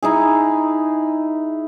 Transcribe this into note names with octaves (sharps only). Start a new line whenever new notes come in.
D#4 E4 G#4